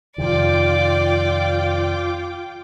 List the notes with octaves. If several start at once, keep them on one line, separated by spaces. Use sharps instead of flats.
F2 C3 D#3 F4 D5 G5 D6